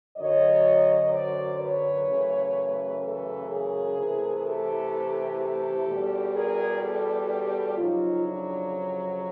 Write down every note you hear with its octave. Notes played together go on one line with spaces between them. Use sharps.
F#2 D3 F#3 C#5 D#5
C5 D5
B4 C#5
F#2 C#3 E3 A3
A4 B4
G#4 A#4
C3 E3 A3
G4 A4
G4 A4
E2 B2 G3
G#4 A#4
G4 A4
G4 A4
F2 C#3 F#3 D#4 F4
D4 E4